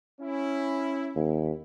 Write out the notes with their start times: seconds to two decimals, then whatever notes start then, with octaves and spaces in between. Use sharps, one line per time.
0.21 C#4 E4
1.16 D#2